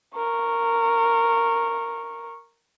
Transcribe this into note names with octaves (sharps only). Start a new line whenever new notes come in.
A#4 C#6